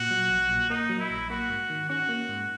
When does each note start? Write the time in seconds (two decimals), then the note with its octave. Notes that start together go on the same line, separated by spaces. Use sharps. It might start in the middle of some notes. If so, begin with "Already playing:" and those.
Already playing: A#2 F#4
0.11 F#3
0.30 A#1
0.49 A#2
0.70 A#3 D#4
0.89 F#3
0.99 E4
1.10 A#1
1.30 A#3 F#4
1.50 G#2
1.70 D#3
1.89 C#4 F#4
2.09 A#3
2.29 G#2